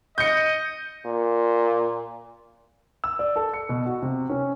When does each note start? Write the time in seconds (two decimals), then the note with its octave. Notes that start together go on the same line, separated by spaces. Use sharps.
0.18 D#5 G6 C#7
1.06 A#2
3.04 E6
3.19 D5
3.36 A4
3.53 C#7
3.69 B2
3.86 F#4
4.02 C3
4.29 C#4